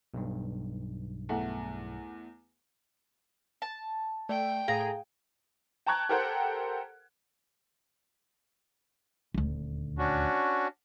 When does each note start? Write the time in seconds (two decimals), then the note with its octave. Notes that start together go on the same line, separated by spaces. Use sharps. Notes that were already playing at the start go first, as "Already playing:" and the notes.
0.14 B1 G2
1.29 E2 A3 F#5
3.62 A5
4.29 A3 D5 G5
4.68 A2 G#4 F5 A#5
5.86 G5 A5 A#5 C#6 F#6 G#6
6.09 G4 A4 A#4 C5 F#5 G5
9.34 D#1 D2
9.98 C#4 D4 F#4